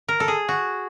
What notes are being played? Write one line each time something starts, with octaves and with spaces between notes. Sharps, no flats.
A#4
A4
G#4
F#4